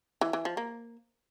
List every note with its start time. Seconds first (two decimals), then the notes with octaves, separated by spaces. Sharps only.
0.21 E3
0.33 E3
0.45 F3
0.57 A#3